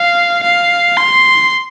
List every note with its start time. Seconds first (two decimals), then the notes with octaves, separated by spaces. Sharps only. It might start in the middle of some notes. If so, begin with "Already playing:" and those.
Already playing: F5
0.43 F5
0.97 C6